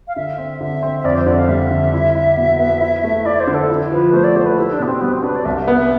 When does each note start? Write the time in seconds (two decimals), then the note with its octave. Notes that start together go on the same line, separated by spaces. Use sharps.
0.08 F5
0.16 D3 E5
0.38 C4 E5
0.61 D3 E5
0.83 C4
1.00 E5
1.04 F2 D5
1.16 C5
1.27 D3 D5
1.38 F5
1.48 G3 E5
1.71 D3
1.93 E4
2.15 E4
2.37 B2
2.59 B3
2.81 E4
3.04 A3
3.25 E4 D5
3.40 C5
3.47 D3
3.54 A4
3.70 E4
3.91 F3 B4
4.13 A3 C5
4.24 D5
4.36 A3 C5
4.46 B4
4.58 E4 G4
4.73 D4
4.79 B2 B3
4.86 C4
5.01 G3 B3
5.13 C4
5.23 D4 B4
5.35 D5
5.45 C2 E5
5.60 E5
5.68 B3
5.75 E5